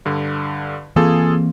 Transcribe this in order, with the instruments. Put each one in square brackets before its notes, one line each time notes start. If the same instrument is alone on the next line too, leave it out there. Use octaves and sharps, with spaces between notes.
[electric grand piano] G2 D3
[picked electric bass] E3 A#3 C4 [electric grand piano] F4 G#4 A4